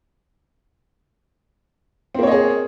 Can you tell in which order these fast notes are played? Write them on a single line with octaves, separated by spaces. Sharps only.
C4 A#3 C#5 D#5 G#4